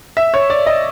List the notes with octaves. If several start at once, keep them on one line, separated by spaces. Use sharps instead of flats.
E5
C#5
D5
D#5